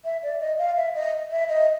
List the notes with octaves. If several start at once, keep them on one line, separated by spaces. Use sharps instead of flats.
E5
D5
D#5
F5
E5
D#5
E5
D#5